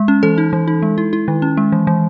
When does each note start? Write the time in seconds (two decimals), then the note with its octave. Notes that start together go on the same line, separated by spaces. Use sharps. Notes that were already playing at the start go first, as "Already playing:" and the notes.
Already playing: G#3
0.08 C#4
0.23 E3 A4
0.38 D#4
0.53 E3
0.68 D#4
0.82 G#3
0.98 E4
1.13 E4
1.28 D#3
1.42 C#4
1.57 G#3
1.72 E3
1.87 E3